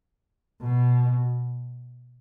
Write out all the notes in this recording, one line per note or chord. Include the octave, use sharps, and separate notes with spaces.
B2